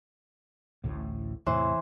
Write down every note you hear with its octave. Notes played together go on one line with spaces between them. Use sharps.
A1 D2 A2
E2 A2 C3 E3 C5